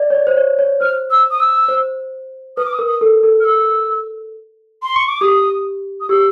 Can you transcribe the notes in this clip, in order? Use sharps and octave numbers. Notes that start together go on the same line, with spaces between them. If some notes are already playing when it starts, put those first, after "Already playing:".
Already playing: D5
C#5
D5
C5
C#5
C#5
C5 F6
E6
D#6
E6
C5
B4 D#6
D6
D#6
A#4
D#6
A4
A4
F6
E6
C6
C#6
D6
G4 D#6
D#6
G4 E6